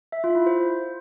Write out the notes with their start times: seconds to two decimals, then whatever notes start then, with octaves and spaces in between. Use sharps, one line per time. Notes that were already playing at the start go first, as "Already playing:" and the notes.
0.12 E5
0.24 F4
0.35 E4
0.46 C5